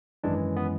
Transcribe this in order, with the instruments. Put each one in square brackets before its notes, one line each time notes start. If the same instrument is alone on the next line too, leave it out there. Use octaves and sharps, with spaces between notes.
[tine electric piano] G#1 F#2 E3 G#3 D4
B3